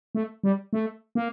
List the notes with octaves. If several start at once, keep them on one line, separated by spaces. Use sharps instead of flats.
A3
G3
A3
A#3